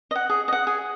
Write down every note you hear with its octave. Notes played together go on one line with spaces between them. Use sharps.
D#5
F#5
G#4
D#5
F#5
G#4